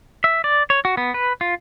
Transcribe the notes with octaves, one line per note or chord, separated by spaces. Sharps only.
E5
D5
C#5
F#4
B3
B4
F4